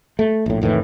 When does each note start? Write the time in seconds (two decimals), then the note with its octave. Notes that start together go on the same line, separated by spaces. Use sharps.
0.19 A3
0.46 A#1 A2
0.61 F1 A2 D#3 E3